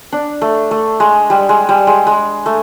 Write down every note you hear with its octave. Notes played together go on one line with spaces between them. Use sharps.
D4
A3
A3
G#3
G3
G#3
G3
G#3
G#3
A3